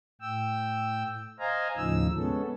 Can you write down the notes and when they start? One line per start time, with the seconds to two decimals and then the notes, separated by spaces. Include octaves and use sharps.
0.21 A2 G5 E6
1.39 C5 D#5 F5 G#5 A#5
1.77 D#2 A2 C#3 F3 D#4 E6
2.16 G#3 B3 C#4 A4